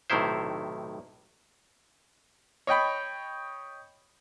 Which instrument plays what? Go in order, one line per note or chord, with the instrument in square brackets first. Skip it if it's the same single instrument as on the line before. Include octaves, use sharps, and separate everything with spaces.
[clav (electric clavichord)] B1 A2 C3 D#3 E4 C5
[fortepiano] C#5 D#5 G5 B5